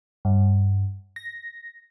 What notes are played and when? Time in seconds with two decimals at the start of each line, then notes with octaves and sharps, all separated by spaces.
0.25 G2
1.16 A#6